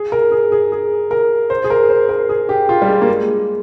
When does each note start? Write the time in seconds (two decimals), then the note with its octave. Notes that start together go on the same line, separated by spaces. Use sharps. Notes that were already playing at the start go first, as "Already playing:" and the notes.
Already playing: G#4
0.12 A#4
0.32 G#4
0.52 G#4
0.72 G#4
1.11 A#4
1.50 C5
1.64 G#4
1.70 A#4
1.89 C5
2.09 A#4
2.29 G#4
2.49 G4
2.69 F4
2.82 G3
2.88 G#3
3.01 A#3
3.08 G#3